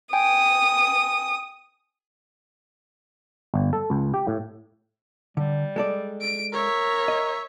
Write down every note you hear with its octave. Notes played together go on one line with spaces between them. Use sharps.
G5 G#5 D#6
G1
A4
C#2
G4
A2
D3 G3
G#3 A4 D5
D7
A#4 C#5 E5
D#5